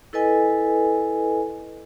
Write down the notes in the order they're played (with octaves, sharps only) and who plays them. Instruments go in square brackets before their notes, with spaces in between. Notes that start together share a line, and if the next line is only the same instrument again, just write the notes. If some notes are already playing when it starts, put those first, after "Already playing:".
[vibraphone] E4 A4 B4 D#5 G#5